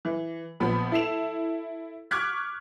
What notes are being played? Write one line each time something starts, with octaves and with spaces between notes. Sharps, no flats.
E3
A#1 F3 B3 B5
E4 A4 C7 E7 F7
C#6 D6 F6 F#6 G#6 B6